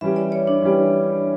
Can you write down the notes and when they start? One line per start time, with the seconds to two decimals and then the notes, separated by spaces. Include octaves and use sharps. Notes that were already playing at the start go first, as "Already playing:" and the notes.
0.01 E3 G3 C#4 G4 E5
0.16 D5
0.32 C#5
0.47 D4
0.62 E3 G3 C#4 G4